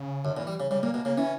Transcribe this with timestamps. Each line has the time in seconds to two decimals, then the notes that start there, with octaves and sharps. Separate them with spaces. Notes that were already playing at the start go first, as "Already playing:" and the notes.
Already playing: C#3
0.24 F#2 D3
0.37 A#2
0.40 E3
0.47 G3
0.60 C#3
0.71 C#3 G3
0.83 A#2 A#3
0.94 B2 A#3
1.05 C#3 A#3
1.17 E3 C#4